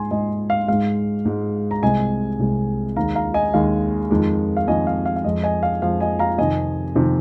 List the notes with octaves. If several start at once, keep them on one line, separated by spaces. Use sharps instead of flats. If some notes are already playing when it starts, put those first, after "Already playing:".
Already playing: G#2 G#3 G#5 C6
G#2 G#3 D#5 G#5
F5
G#2 G#3 F5
G#2 G#3
A#5
C2 C3 G#3 D#5 G#5
C2 C3 G#3
D#2 D#3 G#3 F5 A#5
F5 A#5
D#5 G#5
D#2 D#3 G#3 F5
F2 D#3 G#3
F5
F2 D#3 G#3 D#5 G#5
F5
F5
F5
F2 F3 G#3 D#5
D#5 G#5
F5
F2 F3 G#3 F5
D#5 G#5
F5 A#5
F2 C3 D#3 D#5 G#5
F2 C3 D#3